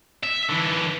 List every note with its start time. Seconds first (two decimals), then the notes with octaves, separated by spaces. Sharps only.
0.23 E5
0.49 D3 E3